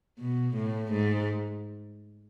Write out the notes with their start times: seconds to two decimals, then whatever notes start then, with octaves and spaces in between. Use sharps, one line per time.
0.19 B2
0.55 A2
0.92 G#2